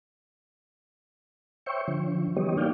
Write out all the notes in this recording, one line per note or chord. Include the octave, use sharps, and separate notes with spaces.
C5 C#5 E5 G5 C#6
D3 F3
E3 G3 B3 G4 C#5 D#5
A#3 D4 D#4 D5 F5 G5